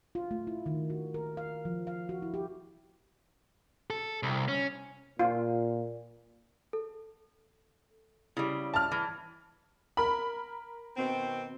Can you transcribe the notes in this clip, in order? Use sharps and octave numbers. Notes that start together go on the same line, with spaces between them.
F4
A3
E4
D#3
F#4
A#4
F5
F3
F5
F#4
E4
G4
A4
C2
C#4
A#2 F4
A4
C#3 G3 E4
A5 F6
E3
A#4 B5
B2 D#3 C4